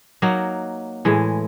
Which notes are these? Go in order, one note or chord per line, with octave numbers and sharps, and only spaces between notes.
F#3 A#3 D#4 F#4
A2 E3 G#3